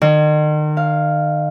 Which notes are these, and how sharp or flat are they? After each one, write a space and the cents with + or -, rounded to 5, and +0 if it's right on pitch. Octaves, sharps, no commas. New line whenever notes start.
D#3 -40
F5 +0